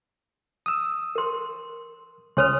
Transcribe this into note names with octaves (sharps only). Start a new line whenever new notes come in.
D#6 E6
A#4 C6
C#2 C#5 G#5 C6 D#6 F6